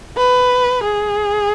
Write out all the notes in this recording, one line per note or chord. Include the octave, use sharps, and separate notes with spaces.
B4
G#4